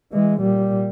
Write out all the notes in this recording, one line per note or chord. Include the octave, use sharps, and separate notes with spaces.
E3 G#3
A#2 G3